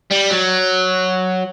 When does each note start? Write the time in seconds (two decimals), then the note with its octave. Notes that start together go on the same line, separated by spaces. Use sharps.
0.12 G3
0.31 F#3